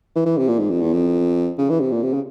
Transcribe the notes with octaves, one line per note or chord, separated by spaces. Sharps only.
E3
E3
C3
A#2
G#2
F2
E2
F2
C#3
E3
C3
A#2
C3
C#3